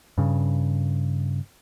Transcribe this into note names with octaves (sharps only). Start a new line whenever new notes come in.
G2 C#3